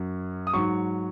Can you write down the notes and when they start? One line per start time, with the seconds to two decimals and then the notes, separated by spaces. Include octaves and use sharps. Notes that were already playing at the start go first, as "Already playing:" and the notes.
Already playing: F#2 F#3
0.47 D#6
0.54 G#2 F#3 C#6